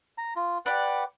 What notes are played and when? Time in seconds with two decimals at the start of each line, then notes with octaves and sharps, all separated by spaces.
0.18 A#5
0.36 F4
0.66 G4 B4 D5 F#5